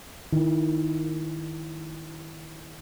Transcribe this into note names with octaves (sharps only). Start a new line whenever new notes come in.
D#3 E4